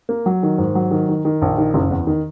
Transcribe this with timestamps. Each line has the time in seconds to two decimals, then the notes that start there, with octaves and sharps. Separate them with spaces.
0.09 A#3
0.26 F#3
0.43 D#3
0.58 G#2
0.75 F#3
0.91 D#3
1.09 D#3
1.25 D#3
1.42 A#1
1.58 D#3
1.74 F#1
1.90 E2
2.07 D#3